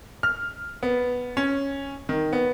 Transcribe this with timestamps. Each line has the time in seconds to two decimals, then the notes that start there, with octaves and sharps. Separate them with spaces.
0.23 F6
0.83 B3
1.37 C#4
2.09 D#3
2.33 B3